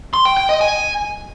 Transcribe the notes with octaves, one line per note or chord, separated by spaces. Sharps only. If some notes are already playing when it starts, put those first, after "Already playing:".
C6
G5
G5
D#5
G#5